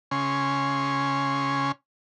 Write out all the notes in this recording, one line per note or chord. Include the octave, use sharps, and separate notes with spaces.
C#3 C#4 G#5 C6